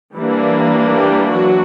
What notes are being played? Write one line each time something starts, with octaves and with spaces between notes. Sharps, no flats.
E3 G3 A#3 D4
G3 G4
F#3 F#4